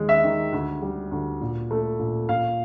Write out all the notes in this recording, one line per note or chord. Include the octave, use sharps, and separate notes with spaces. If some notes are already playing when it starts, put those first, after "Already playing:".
Already playing: D#2 G#3
E5
D#3
D2
G3
D2
A#2
A3
A#2
A#2 F5